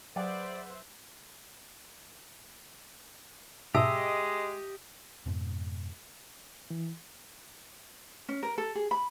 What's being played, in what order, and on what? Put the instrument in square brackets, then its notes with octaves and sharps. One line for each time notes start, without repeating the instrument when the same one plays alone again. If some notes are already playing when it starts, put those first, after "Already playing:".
[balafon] F#3 [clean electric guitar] G#4 F#5 [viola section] B4 C5 E5 [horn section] D5
[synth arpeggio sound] G#2 B2 [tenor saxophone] G#3 [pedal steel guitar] G4 D#5 [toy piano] E5 A5 E6
[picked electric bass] F2 G#2 B2
[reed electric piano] E3
[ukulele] C#4
A#4
A4
G#4
B5